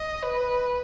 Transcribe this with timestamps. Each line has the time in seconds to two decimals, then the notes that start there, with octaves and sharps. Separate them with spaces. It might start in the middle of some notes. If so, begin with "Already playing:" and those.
Already playing: D#5
0.23 B4